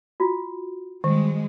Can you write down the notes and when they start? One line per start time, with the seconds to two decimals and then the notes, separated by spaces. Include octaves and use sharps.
0.20 F4 F#4
1.04 D#3 G3 G#3